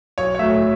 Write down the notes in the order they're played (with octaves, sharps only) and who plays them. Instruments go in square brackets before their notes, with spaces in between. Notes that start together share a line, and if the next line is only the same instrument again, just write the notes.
[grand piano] B1 C#5
C#5
A3 E5
A2 F#3